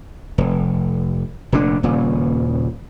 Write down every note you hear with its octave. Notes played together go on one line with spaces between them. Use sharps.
F1
F1 A#2 D3 D4
D#1 A#2 C#3